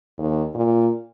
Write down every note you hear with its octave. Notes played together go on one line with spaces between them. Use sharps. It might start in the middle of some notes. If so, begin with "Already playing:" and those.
D#2
A#2